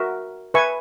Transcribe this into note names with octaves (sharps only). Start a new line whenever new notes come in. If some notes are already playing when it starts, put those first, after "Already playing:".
Already playing: F#4 A#4 E5
B4 E5 G#5 C#6